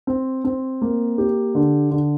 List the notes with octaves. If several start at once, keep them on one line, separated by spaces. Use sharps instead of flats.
C4
C4
A#3
G4
D3
D3